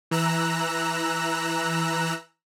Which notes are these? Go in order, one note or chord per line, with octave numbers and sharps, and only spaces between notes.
E3 A#5 E6 F#6